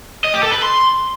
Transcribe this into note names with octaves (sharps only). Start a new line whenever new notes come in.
D#5
G4
A4
B4
C6